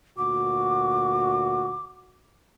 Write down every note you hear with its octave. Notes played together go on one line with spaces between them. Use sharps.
D2 A#2 F#4 D6